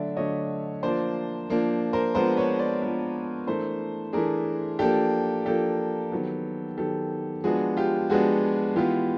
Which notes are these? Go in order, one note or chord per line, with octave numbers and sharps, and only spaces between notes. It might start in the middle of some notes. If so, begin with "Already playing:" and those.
Already playing: D3 F#3 A3 D4 D5 E5
D3 F#3 A3 D4 C#5 D#5
F3 A#3 D4 C5 D5
F3 A#3 D4
A#4 C5
F3 G#3 B3 D4 A#4 C5
B4 C#5
C5 D5
F3 G#3 B3 D4
E3 A3 D4 A#4 C5
E3 A3 D4 G#4 A#4
F3 A#3 D4 G4 A4
F3 A#3 D4 G4 A4
D#3 F#3 B3
D#3 F#3 B3 G4 A4
F3 G#3 B3 D4 F#4 G#4
F4 G4
F3 G#3 B3 D4 F#4 G#4
E3 G#3 B3 F4 G4